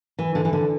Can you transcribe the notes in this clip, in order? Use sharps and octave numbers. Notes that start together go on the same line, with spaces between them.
E3
D3
E3
D3